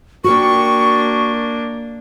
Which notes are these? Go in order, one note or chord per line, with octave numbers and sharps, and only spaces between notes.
A#3 D4 F#4 A#4 G5 C#6